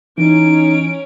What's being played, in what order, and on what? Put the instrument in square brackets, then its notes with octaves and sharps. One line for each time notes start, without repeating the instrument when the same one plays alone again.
[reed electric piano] E3 [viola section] C#4 [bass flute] D#4 [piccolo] D7